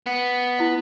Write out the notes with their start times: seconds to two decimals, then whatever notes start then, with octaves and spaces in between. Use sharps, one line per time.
0.06 B3
0.59 E4 D#5